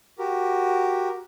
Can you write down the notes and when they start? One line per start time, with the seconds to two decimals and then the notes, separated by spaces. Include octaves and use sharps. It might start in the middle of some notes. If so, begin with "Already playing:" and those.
0.18 F#4 G4 A#4